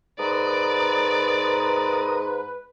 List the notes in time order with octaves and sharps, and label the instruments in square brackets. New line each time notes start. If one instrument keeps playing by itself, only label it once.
[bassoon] G#2 [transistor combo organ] A#4 D#6 [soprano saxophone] B4 [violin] D5